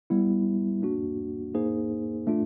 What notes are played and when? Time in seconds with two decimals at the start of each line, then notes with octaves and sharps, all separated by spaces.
0.10 G3 B3 E4
0.82 A#3 D4 F#4
1.54 A#3 D#4 G#4 C5
2.27 A3 D4 F4